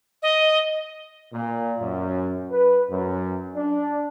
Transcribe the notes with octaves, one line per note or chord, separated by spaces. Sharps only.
D#5
A#2
F#2
B4
F#2
D4